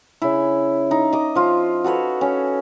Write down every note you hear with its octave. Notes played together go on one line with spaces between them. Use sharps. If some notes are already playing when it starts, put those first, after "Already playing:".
C#3 E4
D#4
D#5 D6
F3 F4
F#4 A4 B4 C#5
C#4